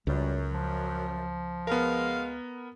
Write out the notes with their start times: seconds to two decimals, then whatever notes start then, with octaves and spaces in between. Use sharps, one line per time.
0.07 C#2 F#2 G3
0.52 F3
1.67 G#3 B3 A#4 F5